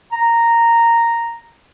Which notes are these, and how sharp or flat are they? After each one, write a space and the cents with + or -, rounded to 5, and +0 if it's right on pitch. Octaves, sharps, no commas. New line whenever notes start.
A#5 -5